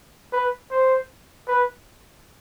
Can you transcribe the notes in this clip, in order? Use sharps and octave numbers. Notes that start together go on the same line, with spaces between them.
B4
C5
B4